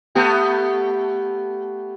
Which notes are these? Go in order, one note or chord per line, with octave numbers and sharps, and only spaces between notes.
A3 B3 G4